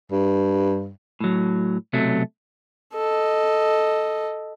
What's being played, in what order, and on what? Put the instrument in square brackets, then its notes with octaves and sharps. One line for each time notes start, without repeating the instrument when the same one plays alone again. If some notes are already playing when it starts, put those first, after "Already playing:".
[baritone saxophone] G2
[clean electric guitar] A2 F#3
B1 C3 F#3 A3
[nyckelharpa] A4 D#5